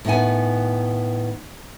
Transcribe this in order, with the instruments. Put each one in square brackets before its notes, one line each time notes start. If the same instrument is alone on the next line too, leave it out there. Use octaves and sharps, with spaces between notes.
[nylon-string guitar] A2 D#3 B3 F#5 G#5